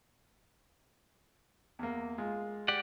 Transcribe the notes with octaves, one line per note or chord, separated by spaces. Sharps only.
E2 A#3
G#3 F4
G4 D5 F#5